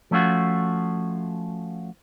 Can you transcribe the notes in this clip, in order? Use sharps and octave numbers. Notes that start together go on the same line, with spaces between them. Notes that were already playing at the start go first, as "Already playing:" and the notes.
F3 A3 C#4 F4 F#4